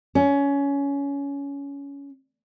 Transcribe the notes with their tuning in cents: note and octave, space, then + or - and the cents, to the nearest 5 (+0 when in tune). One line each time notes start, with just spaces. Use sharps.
C#4 +20